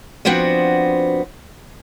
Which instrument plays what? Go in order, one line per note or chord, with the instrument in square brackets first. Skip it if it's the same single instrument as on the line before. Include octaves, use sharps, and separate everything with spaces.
[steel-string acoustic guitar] F3 B3 C4 D4 F#4